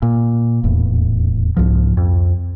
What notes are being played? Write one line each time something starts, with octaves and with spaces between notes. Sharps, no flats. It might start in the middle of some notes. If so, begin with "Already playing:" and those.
A#2
D#1 E2 A2
C2 G#2 F3
F2